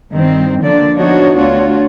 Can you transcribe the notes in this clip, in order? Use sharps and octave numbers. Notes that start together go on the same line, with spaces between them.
G2 D#3 C4
D3 F3 A#3 D4 D5
F3 B3 D4 D#4 F#4 C#5
D2 D4 F4 F#4 C#5